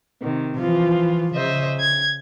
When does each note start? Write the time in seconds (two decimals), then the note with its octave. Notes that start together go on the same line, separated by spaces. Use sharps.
0.20 C3 D#3
0.58 E3 F3 F4
1.35 C#3 C5 D#5 E5
1.80 G#6